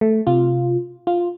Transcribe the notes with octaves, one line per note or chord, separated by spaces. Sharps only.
A3
C3 F4
F4